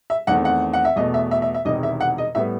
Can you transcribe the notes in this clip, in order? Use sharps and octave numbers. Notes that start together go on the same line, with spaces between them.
E5
E2 D#3 A3 C4 F#5
F#5
F#5
E5
E2 B2 A3 D#5
E5
E5
E5
E5
E1 E2 C3 D#3 D#5
E5
F#5
D#5
A2 G3 B3 E5